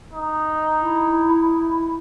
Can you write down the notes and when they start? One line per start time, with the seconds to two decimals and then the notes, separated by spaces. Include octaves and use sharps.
0.13 D#4
0.82 E4